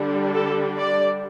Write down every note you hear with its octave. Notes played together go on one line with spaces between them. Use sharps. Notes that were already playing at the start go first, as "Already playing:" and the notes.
Already playing: D3 G3 D4
A4
D5